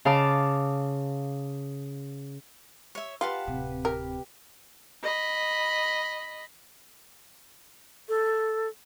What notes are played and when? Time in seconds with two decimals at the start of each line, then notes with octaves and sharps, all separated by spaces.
0.05 C#3 F5 A5 D6
2.95 C#5 E5
3.21 F4 G4 B4 F5 F#5 A5
3.48 D1 C3
3.85 G4 A#4
5.03 D#5 B5
8.09 A4